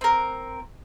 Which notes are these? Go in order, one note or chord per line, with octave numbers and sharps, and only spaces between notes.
C4 A#4